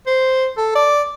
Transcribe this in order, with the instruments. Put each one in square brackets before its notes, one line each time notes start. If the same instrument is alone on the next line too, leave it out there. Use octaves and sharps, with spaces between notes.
[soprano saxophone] C5
A4
D5